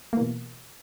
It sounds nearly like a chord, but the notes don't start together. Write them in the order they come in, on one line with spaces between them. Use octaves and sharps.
A#3 E3 B2